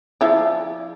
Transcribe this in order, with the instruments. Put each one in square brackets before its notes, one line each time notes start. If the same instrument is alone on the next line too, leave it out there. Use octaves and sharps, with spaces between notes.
[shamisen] F3 E4 D5